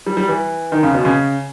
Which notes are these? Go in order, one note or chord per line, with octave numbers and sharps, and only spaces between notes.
G3
G3
E3
D#3
C#3
B2
C#3